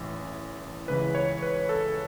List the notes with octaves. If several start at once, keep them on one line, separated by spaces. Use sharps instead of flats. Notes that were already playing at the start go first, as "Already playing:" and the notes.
Already playing: A1 A2 E3
C#2 C#3 E3 B4
C#5
B4
A4